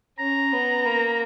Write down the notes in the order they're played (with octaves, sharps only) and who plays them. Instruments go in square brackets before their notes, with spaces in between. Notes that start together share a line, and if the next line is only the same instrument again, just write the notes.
[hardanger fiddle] C#4 [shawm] A#5
[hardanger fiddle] B3
A#3